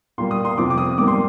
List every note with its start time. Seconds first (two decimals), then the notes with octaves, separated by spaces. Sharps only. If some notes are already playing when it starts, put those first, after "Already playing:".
0.18 A#2 G3 A#3 C6
0.31 D#6
0.45 C6
0.58 F2 C3 F3 C4 D6
0.70 D6
0.78 D#6
0.98 G#2 G3 A#3 D6
1.08 C6